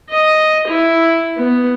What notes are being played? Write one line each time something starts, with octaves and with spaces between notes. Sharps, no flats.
D#5
E4
B3